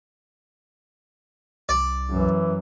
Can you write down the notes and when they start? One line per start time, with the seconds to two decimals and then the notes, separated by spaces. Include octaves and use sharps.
1.69 C2 D5
2.10 F#2 E3